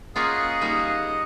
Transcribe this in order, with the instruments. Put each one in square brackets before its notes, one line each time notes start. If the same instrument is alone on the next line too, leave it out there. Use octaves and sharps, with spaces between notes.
[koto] A#3 C#4 F4 [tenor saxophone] G#4 [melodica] D#5 F#5
[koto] G3 A#3 D#4